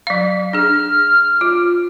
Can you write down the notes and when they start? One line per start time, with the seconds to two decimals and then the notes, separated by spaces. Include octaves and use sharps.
0.07 F#3 F5
0.53 D4 G#4 F6
1.41 F4